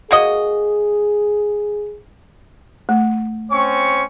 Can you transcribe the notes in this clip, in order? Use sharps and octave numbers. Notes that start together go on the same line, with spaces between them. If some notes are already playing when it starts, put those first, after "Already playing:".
A#3 F#4 G#4 D#5
A3
C4 C#4 C#6